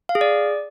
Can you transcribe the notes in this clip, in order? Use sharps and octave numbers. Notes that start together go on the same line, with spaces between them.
F5
G#4
D5